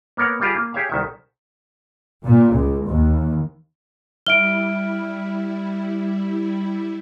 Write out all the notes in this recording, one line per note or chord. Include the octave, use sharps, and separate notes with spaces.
A#3 B3 A#4 C#5 F#5
G3 F4 G4 G#4
A#3
G4 G#4 C#5 E5 F5
C2 D#3 E5
A#2
C#2
D#2
G3 E4 E5 F6 D7 G7